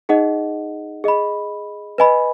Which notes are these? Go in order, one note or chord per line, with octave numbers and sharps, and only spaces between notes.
D#4 G#4 D#5 F#5
G#4 D#5 B5
B4 D#5 G#5 B5